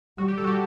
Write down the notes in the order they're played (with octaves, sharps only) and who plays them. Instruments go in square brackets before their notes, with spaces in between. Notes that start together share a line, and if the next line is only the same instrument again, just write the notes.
[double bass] G3 [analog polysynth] F#4
[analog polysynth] G4
A4
F#4
G4